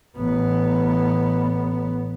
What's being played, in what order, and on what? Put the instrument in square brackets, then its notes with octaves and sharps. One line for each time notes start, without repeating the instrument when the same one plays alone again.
[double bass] A1 B3